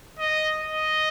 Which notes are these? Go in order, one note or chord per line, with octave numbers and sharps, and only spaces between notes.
D#5
D#5